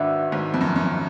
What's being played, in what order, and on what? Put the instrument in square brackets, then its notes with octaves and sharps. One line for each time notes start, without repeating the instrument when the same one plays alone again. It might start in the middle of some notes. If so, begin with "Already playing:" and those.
Already playing: [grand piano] G#1 G#2 [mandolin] D4 F#4 B4 E5
[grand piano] G#1 G#2
F2
F#2
F#2